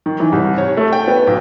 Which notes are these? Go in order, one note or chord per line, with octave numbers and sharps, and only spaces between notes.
D#3
E3
C2
C#5
A3
G5
B3
B1